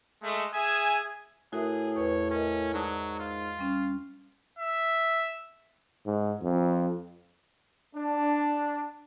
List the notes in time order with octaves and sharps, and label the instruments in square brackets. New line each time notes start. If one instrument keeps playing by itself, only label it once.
[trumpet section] G#3 A3
G#4 E5 G#5
[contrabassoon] A2 [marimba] F#4 A#4 E5 [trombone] G#4
[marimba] E2 B4 [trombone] C#5
[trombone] C#4 [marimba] A#4 D#5
[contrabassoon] G#2 [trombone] F#3 [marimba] D5 A5 D#6
[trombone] F4
[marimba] G3 C#4
[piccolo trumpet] E5
[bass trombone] G#2
F2
[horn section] D4